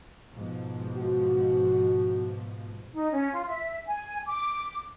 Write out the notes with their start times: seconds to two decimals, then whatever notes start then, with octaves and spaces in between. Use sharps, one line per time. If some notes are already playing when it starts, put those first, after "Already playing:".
0.33 G#2 B2 F3
0.97 F#4
2.93 D#4
3.11 C#4
3.32 F4
3.47 E5
3.87 G#5
4.27 D6